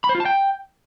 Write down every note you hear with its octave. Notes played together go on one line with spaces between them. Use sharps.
B5
C5
F4
A5
G5